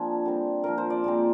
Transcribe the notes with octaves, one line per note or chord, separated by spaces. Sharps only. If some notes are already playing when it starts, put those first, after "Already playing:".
Already playing: F3 A#3 C4 D4 G#4
D3 G3 C4
A#2 F3 C4 A#4
C5
D5
A#2 G#3 C4